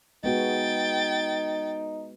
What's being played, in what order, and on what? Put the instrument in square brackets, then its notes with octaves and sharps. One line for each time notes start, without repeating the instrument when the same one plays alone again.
[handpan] G#3 B3 F#4 [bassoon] D#4 [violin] G5 A6